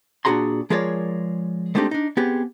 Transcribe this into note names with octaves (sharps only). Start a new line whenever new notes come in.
A#2 D4 F#4 G#4 A#5 C6
F3 G#3 G#4 A#4 C#5 D5
G#3 A3 C4 D4 D#4 G4
D4 D#4
B3 C4 G4 G#4